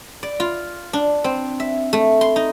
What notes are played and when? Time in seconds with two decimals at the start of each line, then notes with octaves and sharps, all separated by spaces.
0.23 D5
0.40 F4
0.93 D4
1.24 C4
1.60 E5
1.93 A3
2.21 C6
2.36 D#4